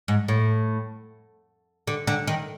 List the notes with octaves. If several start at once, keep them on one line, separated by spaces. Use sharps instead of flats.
G#2
A2
D3
D3
D#3